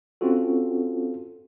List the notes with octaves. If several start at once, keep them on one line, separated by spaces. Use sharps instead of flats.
C4 C#4 F4 F#4 A4